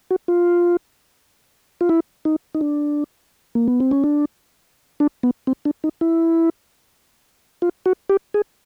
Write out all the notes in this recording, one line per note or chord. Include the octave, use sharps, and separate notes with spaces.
F#4
F4
F4
E4
D#4
D#4
D4
A#3
B3
C4
C#4
D4
D4
B3
C4
D4
D#4
E4
F4
F#4
G4
G#4